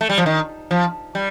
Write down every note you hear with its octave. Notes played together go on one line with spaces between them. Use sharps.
A3
G3
F3
D#3
F3
G3